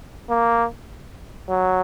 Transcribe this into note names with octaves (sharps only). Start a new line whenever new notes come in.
A#3
F#3